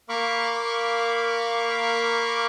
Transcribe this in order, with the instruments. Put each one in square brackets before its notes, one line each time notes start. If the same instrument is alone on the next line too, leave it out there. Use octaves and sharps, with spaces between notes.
[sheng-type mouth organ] A#3 A#4 F5 B5 C#6 D6